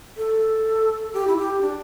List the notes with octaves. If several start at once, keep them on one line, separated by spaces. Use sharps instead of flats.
A4
G4
E4
G4
D4